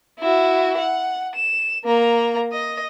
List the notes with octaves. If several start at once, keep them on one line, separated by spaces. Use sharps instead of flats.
E4 F#4
F#5
E7
A#3 A#5
D#5